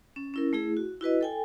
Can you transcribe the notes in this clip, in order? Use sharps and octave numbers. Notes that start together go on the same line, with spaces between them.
C#4
C#4 E4 A#4
A3 E4 G#4
F#4
E4 F#4 B4 D#5
A4 G5 G#5